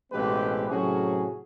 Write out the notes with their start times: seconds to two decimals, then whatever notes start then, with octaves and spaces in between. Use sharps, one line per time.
0.13 A1 B2 G#3 C4 G4 B4
0.69 A2 C3 F#3 C#4 F#4 G#4